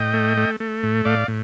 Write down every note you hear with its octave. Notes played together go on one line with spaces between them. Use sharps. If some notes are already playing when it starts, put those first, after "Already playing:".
Already playing: A2 D#5 G5
A3
A3
A3
A2
A2 D5 F5
A2